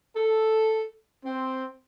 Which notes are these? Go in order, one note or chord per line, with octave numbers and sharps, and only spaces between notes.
A4
C4